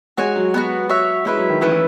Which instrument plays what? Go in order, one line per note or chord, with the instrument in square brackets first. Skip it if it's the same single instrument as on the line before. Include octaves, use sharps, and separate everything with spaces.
[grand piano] G#3 [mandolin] F#4 C#5 G#5
[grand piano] F#3
[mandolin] B3 D#4 F#4
F#4 C#5 E5
[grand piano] G#3 [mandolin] C#4 E4 B4 E5
[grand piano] F#3
D#3
[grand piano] E3 [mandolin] A3 C#4 E4 B4
[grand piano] E3